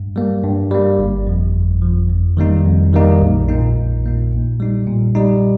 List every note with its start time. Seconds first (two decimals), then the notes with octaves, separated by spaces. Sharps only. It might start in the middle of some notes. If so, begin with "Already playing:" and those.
Already playing: G2
0.16 G3 A#3
0.44 G2
0.71 G3 A#3
0.99 G1
1.27 F2 F3
1.54 G1
1.82 F2 F3
2.10 F2
2.37 D#3 G3 A#3 D#4
2.65 F2
2.93 D#3 G3 A#3 D#4
3.21 A#1
3.49 A#2 A#3 D#4
3.77 A#1
4.04 A#2 A#3 D#4
4.32 A#2
4.60 G3 D#4
4.87 A#2
5.15 G3 D#4